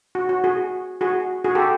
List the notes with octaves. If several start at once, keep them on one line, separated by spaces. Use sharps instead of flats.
F#4
F#4
F#4 G#4
F#4 G#4
F#4 G#4
G4 A4